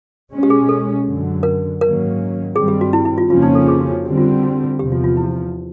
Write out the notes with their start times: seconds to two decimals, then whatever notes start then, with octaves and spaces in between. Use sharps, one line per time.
0.32 B2 G#3 C#4
0.43 G4
0.50 G#4
0.69 A4
1.06 F#2 D3 F#3
1.43 A#4
1.81 G#2 D#3 F#3 A#3 C#4 A#4
2.55 G2 D#3 G3 C4 G#4
2.68 G4
2.81 F#4
2.93 E4
3.05 E4
3.18 F4
3.30 F2 C#3 F3 A#3 C#4 F4
3.42 D#4
3.55 A4
3.68 G#4
3.80 F#4
3.92 F#4
4.05 D3 G3 C4 G4
4.18 F4
4.30 F4
4.43 F#4
4.79 E2 C3 F3 G4
4.92 F4
5.04 F4
5.17 E4